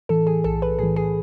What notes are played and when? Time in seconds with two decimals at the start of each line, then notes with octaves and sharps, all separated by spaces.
0.09 A2 E3 A4
0.27 G#4
0.44 B1 A4
0.62 B4
0.79 A2 E3 G#4
0.96 G#4